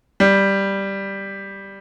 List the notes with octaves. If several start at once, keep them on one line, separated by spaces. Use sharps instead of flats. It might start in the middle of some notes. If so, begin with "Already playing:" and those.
G3